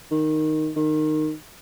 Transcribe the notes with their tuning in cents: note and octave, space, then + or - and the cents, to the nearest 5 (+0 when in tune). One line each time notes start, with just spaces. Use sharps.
D#3 -5
D#3 -15